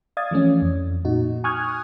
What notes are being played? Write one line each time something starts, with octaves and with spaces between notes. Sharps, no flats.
D5 F5 D#6 G#6 A6
E3 F3 A3 C#4
F2
A#2 D#4 F#4
G#5 C#6 D#6 F6 F#6 G#6